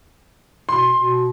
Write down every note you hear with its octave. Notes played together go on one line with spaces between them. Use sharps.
B2 C6
B2